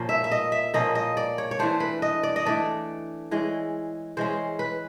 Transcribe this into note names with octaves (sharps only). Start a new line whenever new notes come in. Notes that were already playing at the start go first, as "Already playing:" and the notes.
Already playing: A#2 F3 A#3 C#4
E5
E5
D#5
E5
A#2 F3 A#3 C#4 D#5
D#5
D5
C#5
C#5
E3 A3 D4 C5
B4
D#5
D5
D#5
E3 A3 D4 D5
E3 G#3 C#4
E3 G#3 C#4 C5
B4